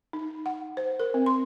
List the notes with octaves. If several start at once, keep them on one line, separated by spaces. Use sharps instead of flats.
D#4
F#5
C5
A#4
C4
C6